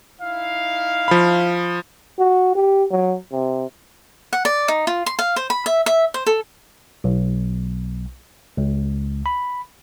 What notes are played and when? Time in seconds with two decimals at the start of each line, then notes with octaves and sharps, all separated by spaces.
0.21 D#4 E4 F5
1.08 F3 B5
2.19 F#4
2.55 G4
2.91 F#3
3.32 C3
4.33 F#5
4.45 D5
4.68 D#4
4.87 F4
5.06 C6
5.19 F5
5.36 C5
5.50 B5
5.66 E5
5.86 E5
6.14 C5
6.26 A4
7.04 B1
8.57 C#2
9.26 B5